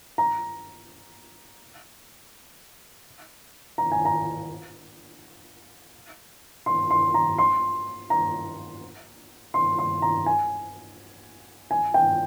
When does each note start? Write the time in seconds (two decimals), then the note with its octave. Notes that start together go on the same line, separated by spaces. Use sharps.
0.18 A#5
3.78 A#5
3.92 G#5
4.05 A#5
6.66 C6
6.90 C6
7.14 A#5
7.38 C6
8.10 A#5
9.54 C6
9.79 C6
10.02 A#5
10.26 G#5
11.71 G#5
11.94 G5